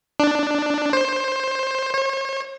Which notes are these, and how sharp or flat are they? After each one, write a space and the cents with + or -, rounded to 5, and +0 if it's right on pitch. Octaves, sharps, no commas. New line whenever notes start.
D4 +10
C5 +20
C#5 -45